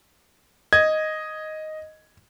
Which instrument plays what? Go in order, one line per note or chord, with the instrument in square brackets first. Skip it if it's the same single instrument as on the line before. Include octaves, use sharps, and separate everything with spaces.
[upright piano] D#5 [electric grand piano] G#6